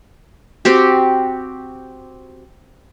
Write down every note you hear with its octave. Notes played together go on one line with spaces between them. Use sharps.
C4 F#4 G4